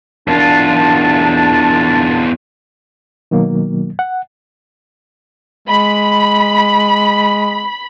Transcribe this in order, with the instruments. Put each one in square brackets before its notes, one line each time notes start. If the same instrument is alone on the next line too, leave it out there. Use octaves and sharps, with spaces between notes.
[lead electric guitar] E2 F4 [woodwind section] A#2 D4 A5
[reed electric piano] B2 D#3 F#3 A#3
F#5
[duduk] G#3 [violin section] B5